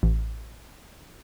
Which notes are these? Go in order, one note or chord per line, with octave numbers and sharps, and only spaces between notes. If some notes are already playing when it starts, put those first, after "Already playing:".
A1